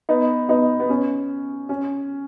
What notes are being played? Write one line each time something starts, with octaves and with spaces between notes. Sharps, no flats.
B3 D#4
B3 D#4
B3
C#4
C#4